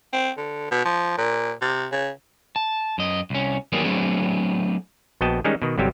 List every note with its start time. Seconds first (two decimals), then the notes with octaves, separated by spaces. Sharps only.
0.13 C4
0.37 D3
0.71 B2
0.85 F3
1.18 A#2
1.61 C3
1.92 C#3
2.56 A5
2.98 F#2 D#5
3.30 C2 C#4
3.72 D#3 F#3 G3 A#3 B3 G#4
3.84 F#3 A3 B3 C4 D4 G#4
5.21 A#1 B3 F#4 D#5 G5 A5
5.44 D#3 G3 G#3 C#4 D#4 G#4
5.62 B2 D#3
5.78 G1 C3 F#3 G3 G4